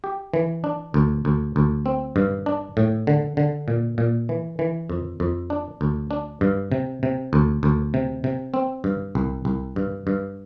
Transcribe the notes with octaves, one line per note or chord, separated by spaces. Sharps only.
G4
E3
D4
D2
D2
D2
C4
G2
D4
A2
D3
D3
A#2
A#2
E3
E3
F2
F2
D4
D2
D4
G2
C3
C3
D2
D2
C3
C3
C4
G2
C2
C2
G2
G2